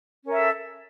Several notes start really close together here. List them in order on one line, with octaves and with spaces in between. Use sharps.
C#4 A#4 E5 A4